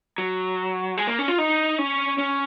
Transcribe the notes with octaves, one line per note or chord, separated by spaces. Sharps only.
F#3
G#3
A#3
C#4
F4
D#4
C#4
C#4